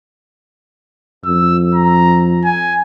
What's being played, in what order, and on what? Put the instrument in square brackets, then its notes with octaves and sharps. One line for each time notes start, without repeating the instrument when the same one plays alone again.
[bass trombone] F2 [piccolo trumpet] E6
[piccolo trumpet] A#5
G#5